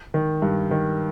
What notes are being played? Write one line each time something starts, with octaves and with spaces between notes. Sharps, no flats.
D#3
G2
D#3